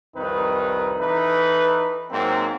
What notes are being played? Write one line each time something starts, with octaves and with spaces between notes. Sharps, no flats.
C2 F2 D#3 C4 D#4 B4
E3 D#4 A4 B4
G#2 F#3 A#3 C4